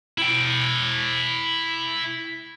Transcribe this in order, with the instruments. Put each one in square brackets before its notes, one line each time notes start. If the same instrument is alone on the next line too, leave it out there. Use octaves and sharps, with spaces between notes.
[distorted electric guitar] E4 G5